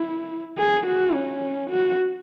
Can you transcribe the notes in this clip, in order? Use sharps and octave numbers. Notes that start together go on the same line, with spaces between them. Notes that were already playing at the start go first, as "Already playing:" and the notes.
Already playing: E4
G#4
F#4
C#4
F#4